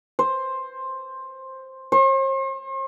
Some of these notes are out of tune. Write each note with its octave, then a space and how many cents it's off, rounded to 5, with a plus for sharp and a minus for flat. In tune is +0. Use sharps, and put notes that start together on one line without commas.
C5 +10
C5 +45